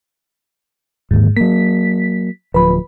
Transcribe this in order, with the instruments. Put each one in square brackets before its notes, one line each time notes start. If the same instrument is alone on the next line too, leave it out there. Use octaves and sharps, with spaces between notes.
[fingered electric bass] D1 D#2 [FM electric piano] G#2
[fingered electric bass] F#3 A#3 [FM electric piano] B6
[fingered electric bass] D1 F3 [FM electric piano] B4 B5